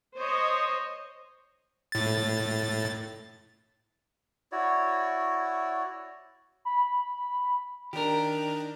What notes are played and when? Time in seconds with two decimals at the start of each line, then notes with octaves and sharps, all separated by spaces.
0.15 C5 C#5 D#5
1.92 A2 A6
4.52 E4 F#4 C#5 D5
6.65 B5
7.93 D#3 D4 G4 A#4